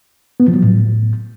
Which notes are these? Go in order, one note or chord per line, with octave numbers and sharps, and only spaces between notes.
B3
F3
F#3
A2